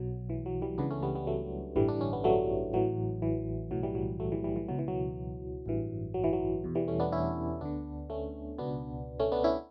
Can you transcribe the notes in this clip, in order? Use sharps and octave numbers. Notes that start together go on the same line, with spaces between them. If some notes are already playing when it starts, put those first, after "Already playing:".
Already playing: B1 B2 F#3
E3
F#3
E3 G3
C#2 C#3 E3 B3 D4
A3 C#4
G3 B3
G3 B3
F#3 A3
A1 G2 D3 E3 G3
D4
C#4
B3
F#3 A3
A1 A2 E3 F#3
E3
B1 A2 E3 F#3
E3 G3
F#3
F#3 A3
E3 G3
E3 G3
E3
C#2 B2 F#3
E3
F#3
A1 G2 E3
F#3
E3
F#3
E2 B2
E3 G3
A3 C#4
B3 D4
C#4 E4
D2 D3 B3 D4
A3 C#4
C#2 B2 B3 D4
A3 C#4
B3 D4
C#4 E4